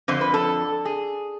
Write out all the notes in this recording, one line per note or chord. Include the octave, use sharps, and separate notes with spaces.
F2 D3 C5
B4
A4
G#4